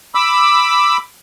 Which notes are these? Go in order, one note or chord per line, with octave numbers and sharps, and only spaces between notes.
B5 D6 E6